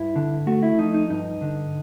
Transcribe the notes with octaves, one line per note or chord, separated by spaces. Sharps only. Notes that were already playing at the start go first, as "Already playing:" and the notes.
Already playing: G2 E4
D3
A3 F#4
E4
F3 D#4
D#4
G2 D#4
D3